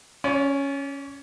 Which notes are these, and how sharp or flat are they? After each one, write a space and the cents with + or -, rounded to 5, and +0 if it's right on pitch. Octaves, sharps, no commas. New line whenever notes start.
C#4 +0 D5 -35